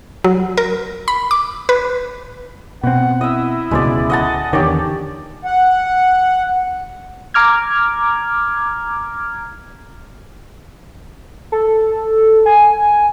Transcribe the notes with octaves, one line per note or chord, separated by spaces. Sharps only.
F#3
A#4
B5
D6
B4
B2 C4 F#5
E4 D#5 E5
D1 C#2 B2 G#3 D5
D#5 F#5 A5
E2 D3 D#3 G4 C#5 D5
F#5
A#5 D6 F6 G#6
A4
G#5